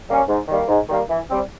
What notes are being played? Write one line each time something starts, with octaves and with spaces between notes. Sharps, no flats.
G3 A#3 C#4
G#2
D#3 G3 A#3
G#2
D#3 G3 A#3
E3
G3 C4